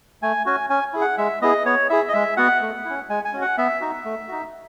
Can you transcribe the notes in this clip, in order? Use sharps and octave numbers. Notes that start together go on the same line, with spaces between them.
A3 G#5
C#4 F#4 G#5
C#4 G#5
E4 G#4
F#5
G#3 E5
B3 E4 G#4 D#5
B3 C#5
E4 G#4 E5
D#5
G#3 E5
B3 F#4 F#5
A3
C#4 E4
G#3 G#5
G#5
C#4 F#4
F#5
B3 E5
D#4 F#4
A3
D#4 F#4